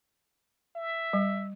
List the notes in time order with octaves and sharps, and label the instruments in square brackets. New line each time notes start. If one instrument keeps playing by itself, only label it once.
[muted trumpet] E5
[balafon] G3